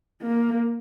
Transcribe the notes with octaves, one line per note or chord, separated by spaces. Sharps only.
A#3